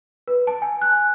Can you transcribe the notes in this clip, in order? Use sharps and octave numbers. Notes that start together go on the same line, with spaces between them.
B4
A5
G#5
F#6